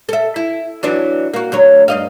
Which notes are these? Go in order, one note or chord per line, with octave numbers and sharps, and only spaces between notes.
A4 E5
E4
E3 F#3 D4
A#3 F#4
D2 F#3 C#5
G2 D#5 F5